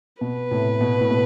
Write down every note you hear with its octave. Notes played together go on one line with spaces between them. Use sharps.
B2 B4
A2 C3
B2
A2
B2